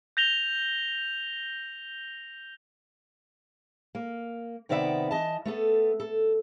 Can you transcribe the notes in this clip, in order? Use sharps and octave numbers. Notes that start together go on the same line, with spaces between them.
G6 A#6 F7 G7
A#3
C3 D#3 B3 D5 E5 F#5
E3 D#5 A5
A3 B3 A4
A4